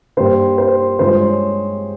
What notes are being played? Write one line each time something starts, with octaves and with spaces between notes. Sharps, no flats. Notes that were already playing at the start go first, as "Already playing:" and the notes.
G2 G3 A#3 C5
C5
G2 F3 G#3 C5
C#5